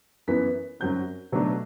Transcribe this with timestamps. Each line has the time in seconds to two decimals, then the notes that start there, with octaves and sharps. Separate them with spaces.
0.27 F#2 E3 B3 B6
0.80 F#2 F#3 C4 G6
1.32 B2 F#3 A3 D4